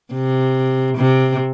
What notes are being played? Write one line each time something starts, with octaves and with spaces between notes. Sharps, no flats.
C3
C3